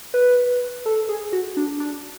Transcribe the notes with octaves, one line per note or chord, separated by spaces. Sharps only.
B4
A4
G#4
F#4
D4
D4